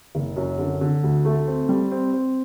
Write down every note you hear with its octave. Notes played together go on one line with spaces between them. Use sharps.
F#1
F#2
D3
D3
D2
A3
C4
G3
C4
C4